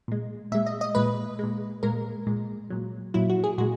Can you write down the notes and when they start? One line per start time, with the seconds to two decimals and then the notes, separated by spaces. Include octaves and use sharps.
0.08 A#2 G#3
0.52 A#2 G#3 E5
0.66 D#5
0.81 D#5
0.95 A#2 G#3 B4
1.39 A#2 G#3
1.83 A#2 G#3 A#4
2.27 A#2 G#3
2.70 A#2 F#3
3.14 A#2 F#3 E4
3.30 F#4
3.44 G#4
3.58 A#2 G#3 F#4